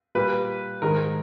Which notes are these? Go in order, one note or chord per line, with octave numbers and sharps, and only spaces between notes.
A#2 G3 B4
G#2 D#3 G#3 A#4